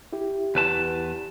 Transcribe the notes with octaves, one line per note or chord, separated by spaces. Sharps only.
E4 G4
E2 B4 A5